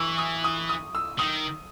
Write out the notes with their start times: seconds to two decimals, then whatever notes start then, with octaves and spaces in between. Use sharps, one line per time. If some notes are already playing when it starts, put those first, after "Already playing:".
Already playing: E3 C#6 E6
0.18 D#6
0.44 D#6
0.69 D#6
0.95 E6
1.19 D#3 D#6